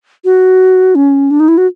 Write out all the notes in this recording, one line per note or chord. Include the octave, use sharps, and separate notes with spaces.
F#4
C#4
D4
D#4
E4
F#4